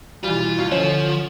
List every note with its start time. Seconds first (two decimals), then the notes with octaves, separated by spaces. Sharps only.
0.24 B2 E3 G3 F4
0.58 D2
0.72 D3 F3 C#4